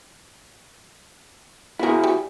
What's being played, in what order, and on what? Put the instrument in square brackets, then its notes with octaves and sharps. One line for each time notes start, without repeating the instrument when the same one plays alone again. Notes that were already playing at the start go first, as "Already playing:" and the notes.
[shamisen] B3 A#4 [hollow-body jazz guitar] E4 F#4 G#4
[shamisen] G3